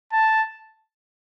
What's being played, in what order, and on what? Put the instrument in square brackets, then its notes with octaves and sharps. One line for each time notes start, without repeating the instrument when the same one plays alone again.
[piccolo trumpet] A5